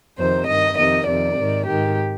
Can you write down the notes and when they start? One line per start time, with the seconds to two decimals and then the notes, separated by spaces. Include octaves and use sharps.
0.17 F2 C3 D#3 C5
0.47 G2 D#3 D#5
0.77 F2 C3 D#3 D#5
1.07 F2 C3 D#3 D5
1.37 G#2 D#3
1.67 G#2 D#3 G4